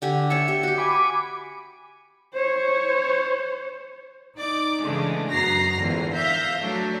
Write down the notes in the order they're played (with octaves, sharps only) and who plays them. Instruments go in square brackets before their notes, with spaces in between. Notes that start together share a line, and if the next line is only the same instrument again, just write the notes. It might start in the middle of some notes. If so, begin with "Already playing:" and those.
[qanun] D3 G4 G#5
[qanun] C#5 E5 A5 [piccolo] C#7
[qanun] G4
F#4 G4
[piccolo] G#5 [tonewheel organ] B5 D6
[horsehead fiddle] C5 C#5
[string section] D#4 D5 D6
C#3 E3 G#3 A3 D4
F#2 B3 F#4 A#5 A#6 C7
A#1 E2 G#2 D3
E5 F5 G6 A#6
F#3 A3 D4